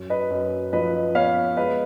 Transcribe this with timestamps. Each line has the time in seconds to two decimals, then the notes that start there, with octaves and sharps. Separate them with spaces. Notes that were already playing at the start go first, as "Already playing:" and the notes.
Already playing: F#2
0.10 B4 D#5
0.31 F#2
0.73 F3 B4 D#5
1.15 B3 C#5 F5
1.57 G#3 B4 D#5